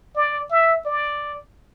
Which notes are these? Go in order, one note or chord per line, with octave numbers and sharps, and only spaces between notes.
D5
E5
D5